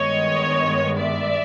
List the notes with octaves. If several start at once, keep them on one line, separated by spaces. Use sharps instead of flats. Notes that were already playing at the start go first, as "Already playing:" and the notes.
Already playing: G2 D#3 G#3 B3 C#5 D#5
D5 E5